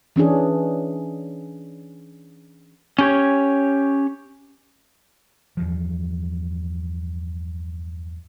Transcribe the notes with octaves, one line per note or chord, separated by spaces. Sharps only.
E3 C#4 D4 G#4
C#4 G4 C#5
E2 G2 F3